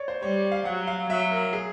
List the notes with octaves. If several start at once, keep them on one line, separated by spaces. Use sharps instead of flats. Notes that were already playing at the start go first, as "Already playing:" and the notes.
Already playing: C#5 D5
C5
G3 C#5
F5
F#3 F#5
F5
F#3 E5
A#4
G#4